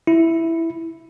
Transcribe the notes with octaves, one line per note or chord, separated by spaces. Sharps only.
E4